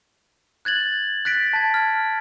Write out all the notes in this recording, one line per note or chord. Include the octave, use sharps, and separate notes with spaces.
F#6 G#6 A6 F#7
F#6 A6 B6 D7
A5 G#6
F6 G#6